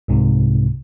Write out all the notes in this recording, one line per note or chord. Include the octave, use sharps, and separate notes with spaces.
C2 G#2 C3